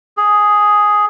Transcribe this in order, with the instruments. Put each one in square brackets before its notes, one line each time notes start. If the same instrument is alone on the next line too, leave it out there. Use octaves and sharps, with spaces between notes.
[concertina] G#4